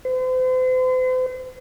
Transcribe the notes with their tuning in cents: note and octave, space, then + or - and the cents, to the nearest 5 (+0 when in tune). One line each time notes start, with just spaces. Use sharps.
C5 -40